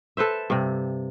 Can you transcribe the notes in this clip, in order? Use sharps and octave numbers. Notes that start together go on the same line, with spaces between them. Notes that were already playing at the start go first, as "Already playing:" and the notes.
A4 B4 C5 E5
G2 C3